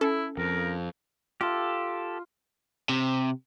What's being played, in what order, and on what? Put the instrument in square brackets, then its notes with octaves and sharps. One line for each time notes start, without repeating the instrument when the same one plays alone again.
[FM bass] C#4 [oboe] E4 [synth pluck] A4
[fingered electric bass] F2 [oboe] A#4
[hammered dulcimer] F4 [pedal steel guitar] G4 A4
[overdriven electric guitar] C3